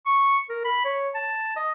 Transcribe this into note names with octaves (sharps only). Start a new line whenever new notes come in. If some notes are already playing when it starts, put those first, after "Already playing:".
C#6
A#4
B5
C#5
A5
D#5